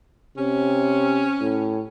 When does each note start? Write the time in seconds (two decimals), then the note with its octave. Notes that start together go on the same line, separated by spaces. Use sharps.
0.37 C3 C#4
1.41 A2